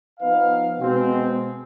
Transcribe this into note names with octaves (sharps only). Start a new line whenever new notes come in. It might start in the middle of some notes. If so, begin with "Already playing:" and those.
F3 B3 D#4 B4 F5
B2 G#3 C4